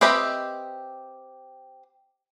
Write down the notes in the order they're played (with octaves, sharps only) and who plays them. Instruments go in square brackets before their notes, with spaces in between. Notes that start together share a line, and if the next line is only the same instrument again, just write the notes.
[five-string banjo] C4 G4 B4 D#5 E5